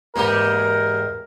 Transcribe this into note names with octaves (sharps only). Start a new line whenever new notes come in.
E2 G#2 G#3 A#3 G4 A#4 D#5